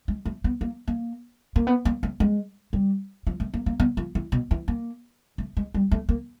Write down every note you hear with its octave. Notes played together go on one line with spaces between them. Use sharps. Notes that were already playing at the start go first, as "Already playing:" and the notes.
G#3
A3
B3
A#3
A#3
A#3
B3
A#3
A3
G#3
G3
F3
A3
A#3
A#3
B3
F3
E3
B2
E3
A#3
A3
G#3
G3
A3
A#3